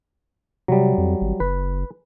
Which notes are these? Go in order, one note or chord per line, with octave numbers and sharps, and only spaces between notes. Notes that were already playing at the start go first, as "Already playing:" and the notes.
C3 F#3 G3
F2
G#1
F#1 B4